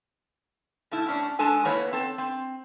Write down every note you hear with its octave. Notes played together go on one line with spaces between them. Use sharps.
B2 A3 E4
A2 C#4 D4
G#3 D4 A4 G#5
E3 A#3 B3 E4 C#5
C4 A4
C4